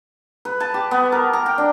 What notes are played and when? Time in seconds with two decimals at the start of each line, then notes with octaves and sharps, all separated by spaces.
0.45 B4
0.60 A5
0.74 G4
0.91 B3
1.12 A#4
1.33 A#5
1.46 G5
1.58 D4